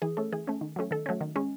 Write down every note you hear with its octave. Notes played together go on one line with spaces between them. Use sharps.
E3 G#4
A3 C#4 A4
E3 G#4
A3 C#4
D#3
F#3 A3 C#4
D#3 A4
F#3 A3 C#4
D#3
G#3 C#4